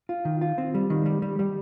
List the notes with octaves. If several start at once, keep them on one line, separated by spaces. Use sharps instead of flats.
F4
D#3
F4
C4
G3
D#3
G3
G3
G3